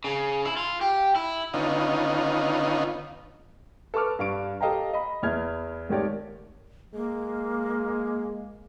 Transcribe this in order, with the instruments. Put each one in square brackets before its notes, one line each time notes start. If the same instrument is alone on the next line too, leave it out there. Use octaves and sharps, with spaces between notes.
[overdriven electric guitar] C#3
E4
F4
G4
E4
[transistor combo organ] D3 D#3 B3 C#4 D#4 F4
[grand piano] A4 B4 C#6 D6 F6
G2 F5 C#6 D7
G4 A4 D#5 F5 G5 A#5
D#5 B5
E2 E4 F6 G#6
G#2 D#3 A3 G4 C#5 D5
[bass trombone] G#3 [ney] A#3